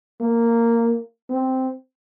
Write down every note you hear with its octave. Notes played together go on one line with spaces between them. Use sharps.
A#3
C4